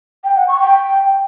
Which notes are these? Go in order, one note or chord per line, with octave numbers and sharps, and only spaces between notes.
G5
F#5
C#6
G5